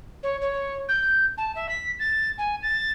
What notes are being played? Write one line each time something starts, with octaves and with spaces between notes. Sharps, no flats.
C#5
C#5
G6
A5
E5
B6
A6
G#5
A6